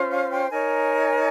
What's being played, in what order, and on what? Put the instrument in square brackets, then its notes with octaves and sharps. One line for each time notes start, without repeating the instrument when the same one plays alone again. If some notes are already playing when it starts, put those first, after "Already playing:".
Already playing: [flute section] C#4 F4 C5
F5
G5
D#4 A#4 C#5 G#5